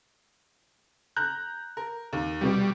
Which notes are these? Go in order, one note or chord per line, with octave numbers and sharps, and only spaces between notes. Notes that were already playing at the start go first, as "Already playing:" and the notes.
A#5 F#6 G6
A#4
D#2
C2 B2 G3